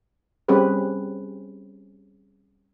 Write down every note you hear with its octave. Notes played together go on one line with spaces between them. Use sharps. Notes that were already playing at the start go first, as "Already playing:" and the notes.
G3 C4 C#4 G4 G#4 B4